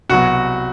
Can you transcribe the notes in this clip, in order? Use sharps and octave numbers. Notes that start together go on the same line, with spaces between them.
C2 B2 F#3 F#4